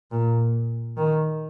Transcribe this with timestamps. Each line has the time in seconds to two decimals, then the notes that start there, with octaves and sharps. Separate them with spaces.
0.12 A#2
0.97 D#3